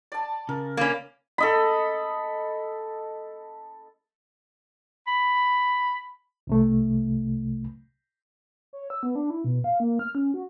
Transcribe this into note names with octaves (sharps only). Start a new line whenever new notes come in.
D5 A5
C#3 A#4
A#3 C#4 D5 B5
A4 D#5 B5
B5
C2 C3 A3
C#5
E6
B3
D4
E4
B2
F5
A#3
F6
C#4
F#4